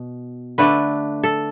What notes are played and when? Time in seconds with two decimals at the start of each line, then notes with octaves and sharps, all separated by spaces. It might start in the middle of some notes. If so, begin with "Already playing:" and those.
Already playing: B2
0.58 D3 A3 D4 B4
1.24 A4